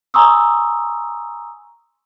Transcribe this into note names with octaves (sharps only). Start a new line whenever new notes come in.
G#5 A#5 C6 C#6 D#6 E6